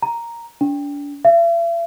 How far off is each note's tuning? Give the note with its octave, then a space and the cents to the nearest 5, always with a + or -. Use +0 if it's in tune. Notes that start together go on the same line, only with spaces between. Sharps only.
A#5 +0
D4 -35
E5 +45